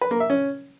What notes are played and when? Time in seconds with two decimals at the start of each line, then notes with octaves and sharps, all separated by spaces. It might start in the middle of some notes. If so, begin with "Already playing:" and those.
0.01 B4
0.11 A#3
0.20 E5
0.30 C#4